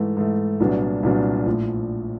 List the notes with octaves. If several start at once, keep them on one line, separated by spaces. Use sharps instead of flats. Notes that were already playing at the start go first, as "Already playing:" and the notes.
Already playing: G#2 E3 A3
G#2 E3 A3
C2 A#2 F#3 B3 D4
C2 A#2 F#3 B3 D4
A#1 A2 F3